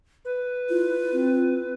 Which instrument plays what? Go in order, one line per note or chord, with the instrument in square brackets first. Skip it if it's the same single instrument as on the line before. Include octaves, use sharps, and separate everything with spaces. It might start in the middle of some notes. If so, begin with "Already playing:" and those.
[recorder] B4
[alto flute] E4 [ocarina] F4
[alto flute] C4